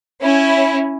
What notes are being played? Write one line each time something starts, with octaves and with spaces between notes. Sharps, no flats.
C#4 E4